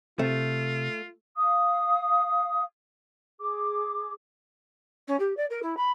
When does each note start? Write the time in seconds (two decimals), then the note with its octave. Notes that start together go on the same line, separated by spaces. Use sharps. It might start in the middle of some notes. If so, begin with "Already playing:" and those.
0.19 C3 A3 F4
1.36 F5 D#6
3.39 G#4 D6
5.07 C#4
5.19 G4
5.37 D5
5.50 A#4
5.62 E4
5.77 B5